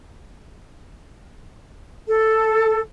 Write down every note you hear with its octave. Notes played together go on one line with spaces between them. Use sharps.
A4